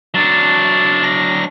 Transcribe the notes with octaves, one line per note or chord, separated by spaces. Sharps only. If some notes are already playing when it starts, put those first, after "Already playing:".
F#3 D4 A5
A#6